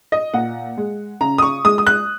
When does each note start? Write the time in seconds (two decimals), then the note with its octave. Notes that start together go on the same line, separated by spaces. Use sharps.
0.12 D#5
0.34 A#2 F#5
0.77 G#3
1.21 C#3 A#5
1.38 D#6
1.42 C#6
1.64 G#3 D#6
1.78 D#6
1.87 F#6